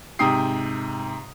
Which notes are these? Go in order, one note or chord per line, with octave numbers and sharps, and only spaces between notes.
G#2 C3 G5 D#6 C7